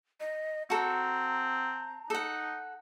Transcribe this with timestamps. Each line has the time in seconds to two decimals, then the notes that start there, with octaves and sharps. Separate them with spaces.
0.20 D#5
0.70 C4 F#4 A4 A5 A#5
2.10 D#4 A4 F#5